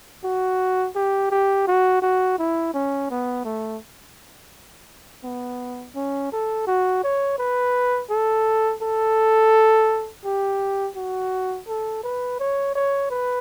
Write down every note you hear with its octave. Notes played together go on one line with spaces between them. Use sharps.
F#4
G4
G4
F#4
F#4
E4
C#4
B3
A3
B3
C#4
A4
F#4
C#5
B4
A4
A4
G4
F#4
A4
B4
C#5
C#5
B4